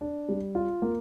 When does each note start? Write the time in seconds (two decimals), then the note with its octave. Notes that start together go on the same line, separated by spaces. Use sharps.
0.01 D4
0.29 G3
0.55 F4
0.82 A#3